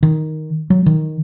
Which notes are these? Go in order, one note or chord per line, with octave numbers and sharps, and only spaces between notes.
D#3
F#3
D#3